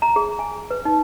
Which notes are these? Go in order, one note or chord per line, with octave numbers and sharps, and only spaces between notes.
A#5
G#4
G#5
B4
D#4